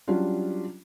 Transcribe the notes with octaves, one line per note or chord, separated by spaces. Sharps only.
F#3 G3 C#4 D4 F4